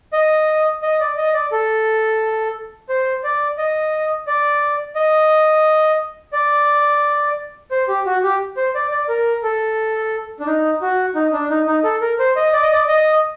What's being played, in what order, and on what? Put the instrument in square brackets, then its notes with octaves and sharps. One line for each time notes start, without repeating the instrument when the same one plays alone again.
[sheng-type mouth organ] D#5
D#5
D5
D#5
D5
A4
C5
D5
D#5
D5
D#5
D5
C5
G4
F#4
G4
C5
D5
D5
A#4
A4
D4
D#4
F#4
D#4
D4
D#4
D#4
A4
A#4
C5
D#5
D5
D#5
D5
D#5